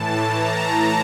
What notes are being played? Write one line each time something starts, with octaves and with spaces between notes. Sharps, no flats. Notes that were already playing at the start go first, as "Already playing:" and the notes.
Already playing: A2 E3 A5
A#5